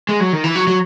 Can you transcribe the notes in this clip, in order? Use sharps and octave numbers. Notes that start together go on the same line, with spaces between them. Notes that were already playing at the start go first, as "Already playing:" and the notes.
G#3
F#3
D#3
E3
F#3
F#3